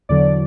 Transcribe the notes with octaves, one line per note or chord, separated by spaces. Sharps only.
E2 D3 F#3 D5